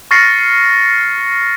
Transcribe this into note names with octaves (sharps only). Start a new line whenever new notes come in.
C#6 F6 A6 A#6 C7 C#7